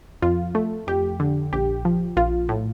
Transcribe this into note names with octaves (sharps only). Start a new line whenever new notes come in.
F2 F4
A3
F2 G4
D3
A#1 G4
F3
A#1 F4
A2